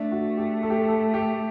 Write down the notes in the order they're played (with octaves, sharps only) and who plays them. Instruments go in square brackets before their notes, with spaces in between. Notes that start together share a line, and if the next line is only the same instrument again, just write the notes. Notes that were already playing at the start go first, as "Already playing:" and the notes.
Already playing: [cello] A3 [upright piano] D4
[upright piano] F#4
G4
A4
G4
A4
A4
G4